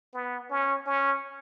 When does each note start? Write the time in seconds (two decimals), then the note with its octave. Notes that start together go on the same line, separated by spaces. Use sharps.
0.14 B3
0.50 C#4
0.86 C#4